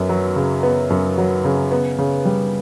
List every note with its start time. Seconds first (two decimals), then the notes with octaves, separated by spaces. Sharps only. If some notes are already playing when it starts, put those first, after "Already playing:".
Already playing: F#2 B3
0.09 F#3
0.36 C#3
0.63 B3
0.90 F#2
1.18 F#3
1.45 C#3
1.72 B3
1.98 C#3
2.25 G3